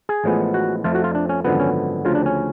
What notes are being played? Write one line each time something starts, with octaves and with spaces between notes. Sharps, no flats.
G#4
A1 A2 F3 G#3 B3
F#4
F2 F3 A3 F4
F#4
F4
D4
C#4
G#1 F#2 D3 F3 B3
C#4
D2 C#3 F3 F4
D4
C#4